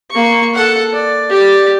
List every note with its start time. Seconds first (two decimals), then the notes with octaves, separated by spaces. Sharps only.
0.11 A#3 C#6
0.54 A4 F#5
0.93 D5
1.30 G4 D5